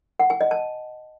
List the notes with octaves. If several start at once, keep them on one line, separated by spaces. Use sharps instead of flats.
F#5
G#5
D#5
A5